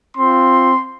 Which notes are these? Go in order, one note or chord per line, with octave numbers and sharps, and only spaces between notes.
C4 F4 C6